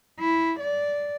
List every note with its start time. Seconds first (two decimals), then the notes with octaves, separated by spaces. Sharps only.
0.19 E4
0.60 D5